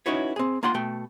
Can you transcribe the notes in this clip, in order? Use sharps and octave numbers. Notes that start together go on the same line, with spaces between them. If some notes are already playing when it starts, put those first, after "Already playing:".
C#4 D#4 E4 F#4 B4 C#5
C4 G#4
A#3 F4 F#5 G5 C6
B2 A3 G5